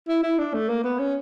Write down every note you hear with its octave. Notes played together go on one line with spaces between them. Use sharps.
E4
E4
D4
A3
A#3
B3
C#4